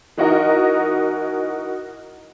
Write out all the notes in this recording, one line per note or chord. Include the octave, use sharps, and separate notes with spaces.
E3 D#4 F#4 A#4 D#5